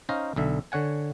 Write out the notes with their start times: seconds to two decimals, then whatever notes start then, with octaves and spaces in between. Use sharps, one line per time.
0.09 C#4 D#4 C5 F5 A#5
0.36 B1 D3 E5
0.72 D3 C#5 F#5 G#5